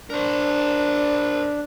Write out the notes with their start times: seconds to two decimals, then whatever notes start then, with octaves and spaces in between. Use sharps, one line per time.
0.10 D4 A#4 C5